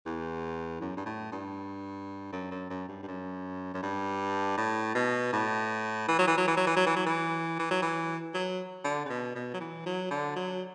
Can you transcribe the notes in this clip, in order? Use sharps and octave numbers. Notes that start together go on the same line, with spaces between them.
E2
F#2
G2
A2
G2
F#2
F#2
F#2
G2
G2
F#2
F#2
G2
A2
B2
A2
E3
F#3
E3
F#3
E3
F#3
E3
F#3
E3
F#3
E3
E3
F#3
E3
F#3
D3
C#3
B2
B2
F#3
E3
F#3
D3
F#3